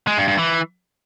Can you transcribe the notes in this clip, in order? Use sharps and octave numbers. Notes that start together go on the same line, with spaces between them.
G#3
G2
G2
E3